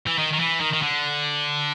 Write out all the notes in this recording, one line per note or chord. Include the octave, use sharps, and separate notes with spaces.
E3
D#3
D#3
E3
D#3
D#3
D3